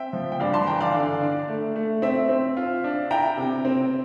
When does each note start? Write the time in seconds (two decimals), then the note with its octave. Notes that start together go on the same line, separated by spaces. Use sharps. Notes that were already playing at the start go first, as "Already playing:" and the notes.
Already playing: C4 E5 G5
0.13 F3
0.32 G5
0.40 G2 D5 F5
0.54 A5 C6
0.67 E3 G5 A#5
0.81 D5 F5
0.94 D3
1.21 D4
1.48 A3
1.76 A3
2.02 C4 E5
2.29 C4
2.57 F4
2.84 D4
3.11 E4 G5 A#5
3.37 C3
3.65 C4